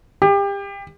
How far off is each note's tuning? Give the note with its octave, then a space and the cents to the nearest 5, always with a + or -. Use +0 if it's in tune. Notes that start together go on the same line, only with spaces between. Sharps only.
G4 +30